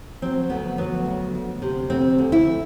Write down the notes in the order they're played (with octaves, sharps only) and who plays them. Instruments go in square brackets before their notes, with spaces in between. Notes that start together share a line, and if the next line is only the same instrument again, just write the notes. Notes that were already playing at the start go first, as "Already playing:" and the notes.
[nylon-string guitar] F#3 C4
D2 B3
F#3 B3
D2
D2
C3
D2 C4
D2
E4